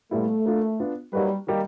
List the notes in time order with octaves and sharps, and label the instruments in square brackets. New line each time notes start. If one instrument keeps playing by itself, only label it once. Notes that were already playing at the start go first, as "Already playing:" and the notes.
[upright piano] A#2 G3 B3 E4 [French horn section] A3
[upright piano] A#3 D4 F4 A#4
B3 D4 F4
[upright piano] F#3 A#3 D#4 F#4 B4 [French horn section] G3
[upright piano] D#3 G3 A#3 D#4 G4